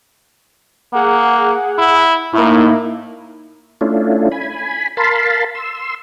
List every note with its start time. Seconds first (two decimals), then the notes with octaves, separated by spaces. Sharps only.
0.93 A#3 G#4 F#5
1.78 E4
2.33 A2 A#3 D#4 E4
3.81 A3 C#4 D4 E4 F4
4.32 G#5 B5
4.97 A#4 F5 A5 B5 C6
5.55 C6 E6